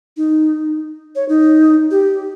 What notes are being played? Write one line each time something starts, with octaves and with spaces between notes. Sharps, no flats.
D#4
C#5
D#4
G4